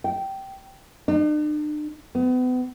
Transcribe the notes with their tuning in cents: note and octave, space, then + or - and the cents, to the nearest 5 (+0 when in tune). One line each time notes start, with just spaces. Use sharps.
G5 -15
D4 +45
B3 +35